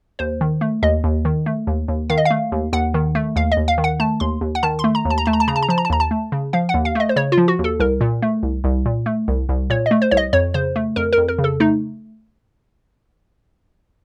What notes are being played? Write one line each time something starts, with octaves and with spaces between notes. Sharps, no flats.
D#2 C5
D#3
A3
D#2 D#5
D#2
D#3
A3
D#2
D#2
D#3 F5
D#5
F5
A3
D#2
D#2 F#5
D#3
A3
D#2 F5
D#5
D#2
F5
D#3
F#5
A3 A5
D#2 C6
D#2
F#5
D#3 A5
C6
A3
A#5
D#2
A5
A#5
A3 A5
A#5
A5
C#3 A#5
A5
A#5
F3 A5
A#5
A5
D#2 A#5
A5
A3
C#3
F3 F5
F#5
D#2
F5
A3 D#5
C5
C#3 C#5
F4
F3
F#4
D#2
A4
C2 A#4
A#2
A3
C2
C2
A#2
A3
C2
C2
A#2 C#5
D#5
A3
C5
C2 C#5
D#5
F2 C#5
C#3 C5
A3
F2 A#4
A#4
F2
A#4
C#3
A4
A3 D#4